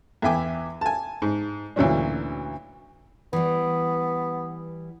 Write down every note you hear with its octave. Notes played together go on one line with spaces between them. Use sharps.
E2 E3 E5 G5 G#5 D6
G#5 A5
G#2
D2 A#2 E3 F#3 C#4 D4
E3 G3 B3